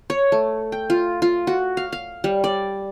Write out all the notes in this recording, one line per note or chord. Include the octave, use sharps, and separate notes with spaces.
C#5
A3
G5
F4
F4
F#4
F5
F5
G3
D5